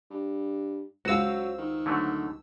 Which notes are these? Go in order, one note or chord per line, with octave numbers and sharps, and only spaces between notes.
G2
C#2 F#3 F#4 C5 F5 E6
D#3
D3 F#3 A3